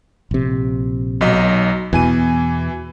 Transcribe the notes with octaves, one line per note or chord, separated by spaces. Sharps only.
A#1 C3
B1 F#3 D#5
E2 B2 E3 G#5 D#7